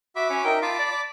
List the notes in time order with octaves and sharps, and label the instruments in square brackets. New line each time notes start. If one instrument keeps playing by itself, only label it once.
[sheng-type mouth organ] F#4 B5 D6 [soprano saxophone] E5
[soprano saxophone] C#4
[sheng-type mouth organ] D#4 A#4 E5 [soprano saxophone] G5
[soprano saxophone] F4 [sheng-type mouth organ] A5 B5 D6
[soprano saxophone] D5
D5